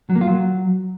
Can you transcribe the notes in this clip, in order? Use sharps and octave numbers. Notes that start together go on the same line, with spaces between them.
F#3
A#3
F4
F#3